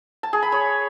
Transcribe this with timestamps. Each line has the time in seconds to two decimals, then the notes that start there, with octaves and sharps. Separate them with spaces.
0.23 A5
0.33 G#4
0.43 B5
0.52 C#5